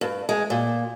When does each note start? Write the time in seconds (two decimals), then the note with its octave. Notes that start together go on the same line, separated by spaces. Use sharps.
0.01 G2
0.29 G#3
0.50 A#2